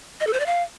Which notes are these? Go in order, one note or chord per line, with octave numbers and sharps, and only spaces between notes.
D#5
A4
C5
D5
F5